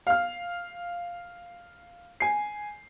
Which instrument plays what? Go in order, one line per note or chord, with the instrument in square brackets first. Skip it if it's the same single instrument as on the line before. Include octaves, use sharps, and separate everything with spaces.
[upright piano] F5 F6
G#5 C7